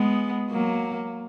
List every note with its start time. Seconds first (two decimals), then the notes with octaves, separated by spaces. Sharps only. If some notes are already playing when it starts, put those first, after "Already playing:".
Already playing: G#3 B3
0.50 F#3 A#3